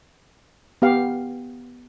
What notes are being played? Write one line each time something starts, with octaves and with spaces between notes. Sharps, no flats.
B3 G4 F5